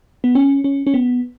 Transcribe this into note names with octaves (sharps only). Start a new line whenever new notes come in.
B3
C#4
C#4
C#4
B3